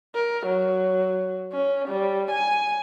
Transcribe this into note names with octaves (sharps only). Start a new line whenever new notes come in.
A#4
F#3
C#4
G3
G#5